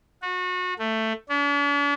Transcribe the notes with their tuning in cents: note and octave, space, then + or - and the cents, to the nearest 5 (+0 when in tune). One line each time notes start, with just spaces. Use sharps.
F#4 -30
A3 +10
D4 -45